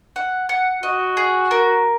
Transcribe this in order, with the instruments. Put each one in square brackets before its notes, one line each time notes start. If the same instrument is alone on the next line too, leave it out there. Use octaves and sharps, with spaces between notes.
[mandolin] F#5
F#5
[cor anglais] F#4 [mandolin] D#5
[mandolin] G#4
A#4